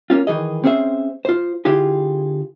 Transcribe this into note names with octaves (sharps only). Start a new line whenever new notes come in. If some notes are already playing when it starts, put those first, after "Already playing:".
A#3 C#4 F4
D#3 E3 G#4 D#5
C4 C#4 G#4 C5 E5
F4 C5
D3 E4 F4 G4 G#4